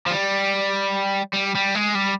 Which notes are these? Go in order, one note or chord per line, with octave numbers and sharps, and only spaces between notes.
F3
G3
G3
G3
G#3
G3